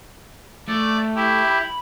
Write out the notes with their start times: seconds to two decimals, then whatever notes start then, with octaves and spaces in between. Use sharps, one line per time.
0.68 A3 D5
1.15 E4 G4
1.47 B5